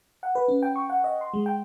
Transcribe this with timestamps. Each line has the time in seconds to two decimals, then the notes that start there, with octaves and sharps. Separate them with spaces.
0.23 F#5
0.35 B4
0.48 C#4
0.63 G5
0.76 C#6
0.90 F#5
1.04 D#5
1.21 C6
1.33 G#3
1.46 G5